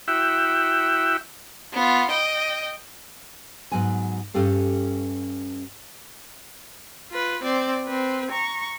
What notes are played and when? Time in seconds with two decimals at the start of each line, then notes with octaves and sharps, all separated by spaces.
0.08 E4 F#4 E5 G5
1.73 B3 F4
2.10 D#5 G5
3.72 G#2 F#3 B3 G#5
4.34 G2 C#4 G4 A4 F5
7.10 F4 B4
7.43 C4 D5
7.87 C4 B4
8.31 A#5 C#6